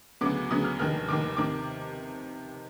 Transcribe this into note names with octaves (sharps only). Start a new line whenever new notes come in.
D2 C#3 F#3 B3 D6
D2 C#3 F#3 B3 D#6
F6
F1 D#2 D#3 F6
F1 D#2 D#3 D6
C3 D#3 D6